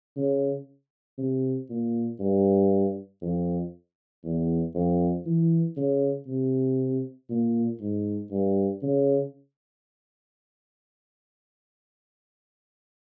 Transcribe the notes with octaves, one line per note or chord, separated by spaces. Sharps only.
C#3
C3
A#2
G2
F2
E2
F2
E3
C#3
C3
A#2
G#2
G2
C#3